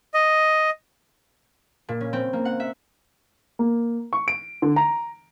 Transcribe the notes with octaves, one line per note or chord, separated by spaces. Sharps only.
D#5
A#2
C#4
C4
A#3
F#5
E5
A#3
C#6
D7
D3
A#5